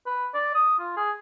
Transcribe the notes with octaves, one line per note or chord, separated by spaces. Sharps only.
B4
D5
D#6
F4
G#4